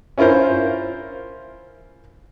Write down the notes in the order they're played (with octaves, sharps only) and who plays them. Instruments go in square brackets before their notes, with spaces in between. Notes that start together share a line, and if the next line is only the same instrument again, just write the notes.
[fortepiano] C#4 E4 F4 A#4 C5